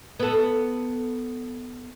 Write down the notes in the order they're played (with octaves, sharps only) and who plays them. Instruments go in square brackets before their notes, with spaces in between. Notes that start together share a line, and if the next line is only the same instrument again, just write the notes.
[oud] B3 A4